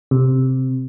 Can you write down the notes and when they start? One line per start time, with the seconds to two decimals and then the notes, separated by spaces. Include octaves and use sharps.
0.11 C3